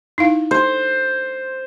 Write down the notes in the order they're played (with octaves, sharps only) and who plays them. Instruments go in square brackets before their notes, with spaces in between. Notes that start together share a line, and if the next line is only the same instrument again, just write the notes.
[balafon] D#4 E4 F5
[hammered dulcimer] C5